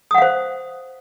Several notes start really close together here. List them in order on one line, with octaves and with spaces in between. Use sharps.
D#6 F#5 F5 C5